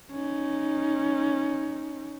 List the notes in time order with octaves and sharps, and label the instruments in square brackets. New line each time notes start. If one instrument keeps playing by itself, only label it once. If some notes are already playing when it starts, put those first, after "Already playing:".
[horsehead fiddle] C#4 D#4